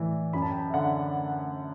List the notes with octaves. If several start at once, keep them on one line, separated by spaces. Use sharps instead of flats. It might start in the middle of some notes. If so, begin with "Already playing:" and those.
Already playing: A2 E3 D5
F#2 B5
A5
G5
A5
E5
D3 F#5